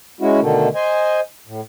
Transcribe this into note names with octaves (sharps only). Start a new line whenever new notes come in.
G#3 C#4 E4 F#4
B2 D3 D#3 A3
C5 D#5 G#5
A2